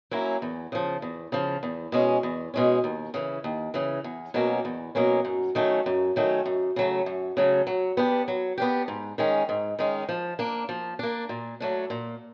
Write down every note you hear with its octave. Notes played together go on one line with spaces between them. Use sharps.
F#3 A#3 C#4 E4
E2
C#3 F3
E2
C#3 F3
E2
B2 G#3 C#4
E2
B2 G#3 C#4
D#2
C#3 E3
D#2
C#3 E3
E2
B2 F#3 A#3 C#4
E2
B2 F#3 A#3 C#4
F#2
D#3 F#3 A3 C#4
F#2
D#3 F#3 A3 C#4
F#2
C#3 F#3 A3
F#2
C#3 F#3 A3
F#3
B3 D4 G4
F#3
B3 D4 G4
G#2
D#3 G#3 C#4
G#2
D#3 G#3 C#4
F3
A#3 D4
F3
A#3 D4
A#2
F#3 A3 D4
A#2